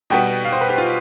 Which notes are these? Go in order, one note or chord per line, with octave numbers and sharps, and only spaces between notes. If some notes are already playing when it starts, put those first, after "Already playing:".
B2 G3 B3 G5
F5
C5
B4
G4
F4